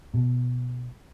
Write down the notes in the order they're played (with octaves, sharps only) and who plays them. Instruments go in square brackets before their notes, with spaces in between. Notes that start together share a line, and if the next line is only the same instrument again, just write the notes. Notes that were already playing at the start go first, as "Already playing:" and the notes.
[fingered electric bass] B2